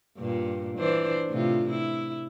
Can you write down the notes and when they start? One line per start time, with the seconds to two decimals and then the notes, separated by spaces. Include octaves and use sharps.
0.17 G2 A#2
0.78 E3 D4 C5
1.29 A2 C3 F4
1.70 E4